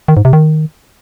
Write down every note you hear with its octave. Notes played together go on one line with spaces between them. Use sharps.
D#3
G#2
C3
D#3